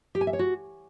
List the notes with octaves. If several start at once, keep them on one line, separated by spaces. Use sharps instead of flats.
G4
G#5
E5
C#5
F#4